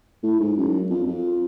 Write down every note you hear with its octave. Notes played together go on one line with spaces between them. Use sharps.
A2
G#2
F#2
F2
F2